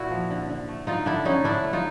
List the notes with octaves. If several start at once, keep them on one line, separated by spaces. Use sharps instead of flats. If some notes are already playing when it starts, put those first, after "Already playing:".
Already playing: A#2 E4 F#4
F3
D3
D3
A3
D3 D#4 F4
D3 D4 E4
D3 C#4 D#4
A2 D4 E4
A3
D#4 F4